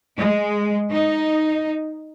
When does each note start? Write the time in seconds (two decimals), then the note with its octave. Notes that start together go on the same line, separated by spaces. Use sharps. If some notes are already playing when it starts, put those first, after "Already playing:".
0.18 G#3
0.93 D#4